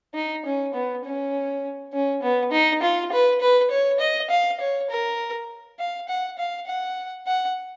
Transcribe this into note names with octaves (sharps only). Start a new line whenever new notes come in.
D#4
C#4
B3
C#4
C#4
B3
D#4
F4
B4
B4
C#5
D#5
F5
C#5
A#4
F5
F#5
F5
F#5
F#5